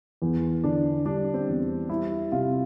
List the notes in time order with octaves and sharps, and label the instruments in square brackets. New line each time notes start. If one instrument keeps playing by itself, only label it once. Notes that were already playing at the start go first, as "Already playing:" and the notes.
[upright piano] E2
[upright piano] D3 [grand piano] D4
[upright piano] G3 [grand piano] D4
[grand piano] C4
[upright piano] E2
[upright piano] G3 [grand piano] E4
[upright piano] C3 [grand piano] F4